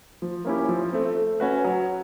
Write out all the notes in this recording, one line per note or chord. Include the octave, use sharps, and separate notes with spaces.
F3
A#3 C#4 E4 G4
F3
A3 C4
A3
C#4 F#4 B4
F#3